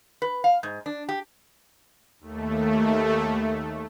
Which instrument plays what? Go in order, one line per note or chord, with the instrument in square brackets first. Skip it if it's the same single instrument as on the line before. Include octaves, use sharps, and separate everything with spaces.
[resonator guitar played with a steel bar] B4
F5
G#2
D4
G4
[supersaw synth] D#2 A3